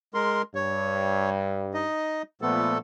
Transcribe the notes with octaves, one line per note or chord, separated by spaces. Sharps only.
G#3 A#4 C6
G2 C#5
D#4 D#5
A#2 F3 A3 B3 A4